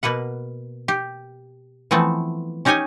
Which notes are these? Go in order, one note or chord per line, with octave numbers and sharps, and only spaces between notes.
B2 A#3 B4 F#5
G4
E3 F3 A3 B3 C4
C#4 D#4 G4 C#5 D#5 G#5